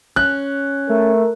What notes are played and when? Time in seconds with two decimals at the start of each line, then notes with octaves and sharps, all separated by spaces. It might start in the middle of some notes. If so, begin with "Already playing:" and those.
0.16 C#4 F#6
0.89 A3 A#4